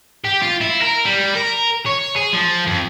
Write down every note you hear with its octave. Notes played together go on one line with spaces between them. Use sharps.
G4
F4
E4
A#4
G3
A#4
C#5
G#4
F3
F2